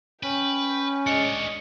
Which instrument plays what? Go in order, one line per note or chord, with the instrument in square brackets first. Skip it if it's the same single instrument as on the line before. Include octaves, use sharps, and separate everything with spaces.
[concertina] C#4 [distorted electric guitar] B4 [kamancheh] G5
[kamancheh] G#3 [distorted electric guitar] D4 C#5 [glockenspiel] C#7